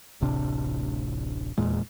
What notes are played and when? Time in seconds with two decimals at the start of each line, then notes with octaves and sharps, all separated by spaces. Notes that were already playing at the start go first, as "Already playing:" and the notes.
0.21 D1 A1 C3 D4
1.58 D#1 E2 A#2 G#3